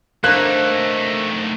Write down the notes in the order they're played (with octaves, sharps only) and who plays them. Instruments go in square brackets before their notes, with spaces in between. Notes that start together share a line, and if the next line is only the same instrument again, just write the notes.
[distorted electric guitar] A3 D#4 [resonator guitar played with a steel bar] A#3 [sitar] C4 D4 [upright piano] F#6